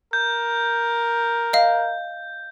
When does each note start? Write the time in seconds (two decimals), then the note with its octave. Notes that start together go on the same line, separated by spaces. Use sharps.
0.13 A#4 G6
1.53 D#5 F5